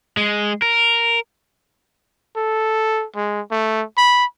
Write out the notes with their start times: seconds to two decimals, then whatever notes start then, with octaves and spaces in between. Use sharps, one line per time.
0.17 G#3
0.62 A#4
2.36 A4
3.15 G#3
3.51 A3
3.97 B5